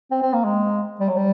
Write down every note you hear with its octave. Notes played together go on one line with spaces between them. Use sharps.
C4
C4
A#3
G#3
G3
F#3
G3